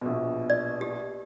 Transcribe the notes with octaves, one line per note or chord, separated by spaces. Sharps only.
A#1 B2
D5
G4